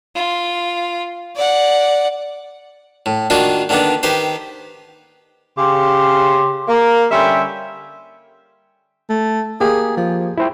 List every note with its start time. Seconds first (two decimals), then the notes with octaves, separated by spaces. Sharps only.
0.15 F4
1.36 D5 F#5
3.06 A2
3.30 D#3 A#3 D4 D#4 F4 F#4
3.69 D3 D#3 A#3 B3 D4
4.03 D#3 G4 B4 C5
5.57 C#3 G4 C6
6.68 A#3
7.11 D3 G3 C#4 E5 G5 C6
9.10 A3
9.61 A#3 G4 G#4
9.97 F3
10.38 E4 C5 G5